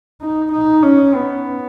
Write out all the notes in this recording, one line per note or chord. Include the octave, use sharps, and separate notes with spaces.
D#4
D#4
C#4
B3